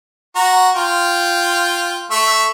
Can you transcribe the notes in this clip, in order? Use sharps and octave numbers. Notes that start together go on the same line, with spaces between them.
F#4 A#5
F4 G5
A3 E5 C#6